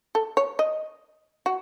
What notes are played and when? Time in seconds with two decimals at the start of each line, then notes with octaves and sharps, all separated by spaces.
0.15 A4
0.37 C#5
0.59 D#5
1.46 F#4